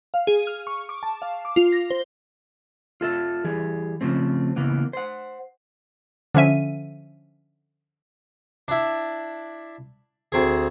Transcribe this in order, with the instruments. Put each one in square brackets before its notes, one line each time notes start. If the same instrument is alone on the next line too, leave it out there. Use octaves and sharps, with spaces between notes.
[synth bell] F5
G#4
F6
C#6
D6
A5
F5
D6
F4
A#6
C5
[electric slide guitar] F4 A4 E5
E3 G3 G#4
C#3 F3 A3 C4
C#3 E3 A#3 B3
C5 F#5
[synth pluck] D3 F3 C#4 E5 D#7
[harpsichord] D4 E4
D2 C4 G#4